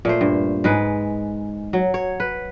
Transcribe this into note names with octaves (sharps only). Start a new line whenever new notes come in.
A#2 A3 C5
G2
G#2 G#3 B4
F#3
C#5
B4